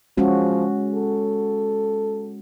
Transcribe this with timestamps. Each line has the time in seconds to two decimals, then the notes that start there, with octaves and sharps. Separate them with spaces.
0.18 F3 G#3 C#4 F#4
0.95 A4